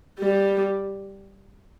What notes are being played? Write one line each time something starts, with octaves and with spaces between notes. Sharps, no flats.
G3